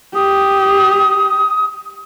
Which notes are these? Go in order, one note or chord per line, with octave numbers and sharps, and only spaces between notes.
G4 D#6